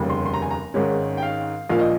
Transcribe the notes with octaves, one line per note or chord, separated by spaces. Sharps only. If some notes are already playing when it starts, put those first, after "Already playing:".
Already playing: F1 D#2 C#3 G3
C6
C6
A#5
G#5
A#5
G#1 G#2 D#3 G#3 C#4
G5
F5
A#1 A#2 F3 A#3 F5
D#5